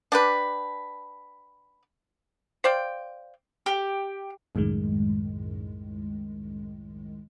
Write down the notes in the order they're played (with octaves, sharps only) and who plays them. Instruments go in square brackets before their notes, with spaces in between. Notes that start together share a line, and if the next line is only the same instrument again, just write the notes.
[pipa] D4 G4 B4
C5 D5 F5 G5
[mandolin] G4
[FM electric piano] C2 F#2 A2 D#3 G#3